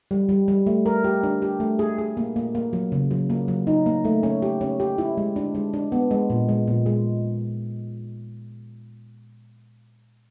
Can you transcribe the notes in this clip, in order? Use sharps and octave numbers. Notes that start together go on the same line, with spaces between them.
G3
G3
G3
A3
A#4
G4
D4
G4
A3
G#4
G#4
A#3
A#3
A#3
F#3
C#3
F#3
A#3
F#3
D#4
A#3
A3
C#4
G4
C#4
G4
E4
G#3
D4
G#3
D4
B3
G#3
A#2
G#3
A#2
G#3